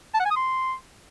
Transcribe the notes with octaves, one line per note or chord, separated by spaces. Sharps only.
A5
F#5
G#5
D#6
C6